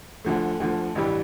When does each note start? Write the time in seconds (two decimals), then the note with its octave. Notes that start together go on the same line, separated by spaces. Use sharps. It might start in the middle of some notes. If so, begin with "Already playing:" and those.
0.25 D2 D3 F3 A3
0.60 D2 D3 F3 A3
0.95 A1 G2 E3 G3